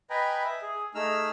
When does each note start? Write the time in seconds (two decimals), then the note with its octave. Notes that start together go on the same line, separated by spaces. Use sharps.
0.10 B4 D#5 G5 G#5 A#5 B5
0.44 E5
0.62 G#4
0.95 A3 D#4 G#4 E6 F6